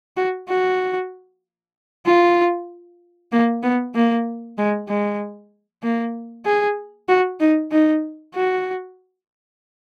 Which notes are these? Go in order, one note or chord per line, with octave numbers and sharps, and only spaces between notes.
F#4
F#4
F4
A#3
B3
A#3
G#3
G#3
A#3
G#4
F#4
D#4
D#4
F#4